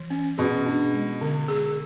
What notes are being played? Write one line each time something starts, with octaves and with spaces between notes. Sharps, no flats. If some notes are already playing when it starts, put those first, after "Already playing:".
Already playing: E3
C#4
B2 G#4
D4
G#3
D3
G#4